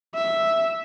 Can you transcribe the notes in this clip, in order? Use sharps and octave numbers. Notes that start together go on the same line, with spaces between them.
E5